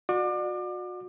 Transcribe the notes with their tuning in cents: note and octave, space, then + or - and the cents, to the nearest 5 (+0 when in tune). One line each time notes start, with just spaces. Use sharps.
F#4 -35 D5 +35 D6 +30